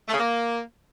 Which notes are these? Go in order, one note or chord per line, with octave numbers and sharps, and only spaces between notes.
A3
C#3
A#3